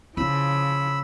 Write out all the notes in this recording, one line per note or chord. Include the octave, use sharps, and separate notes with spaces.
C#3 F3 E4 B5 E6